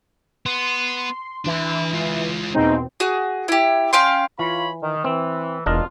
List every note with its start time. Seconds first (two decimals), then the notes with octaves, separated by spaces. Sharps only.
0.46 B3 C6
1.46 E3 D4 E5
1.93 G#3 F4
2.54 E2 B2 G#3 A#3 C4 D#4
3.00 F#4 G#4
3.48 E4 G4
3.93 C#4 F5 G5 C6
4.39 E3 F4 C#5 B5
4.83 D#3
5.04 E3 C4
5.66 E1 D4 F4 A#4 D#5